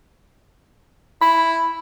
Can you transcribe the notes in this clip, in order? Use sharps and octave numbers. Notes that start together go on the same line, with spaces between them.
E4 B5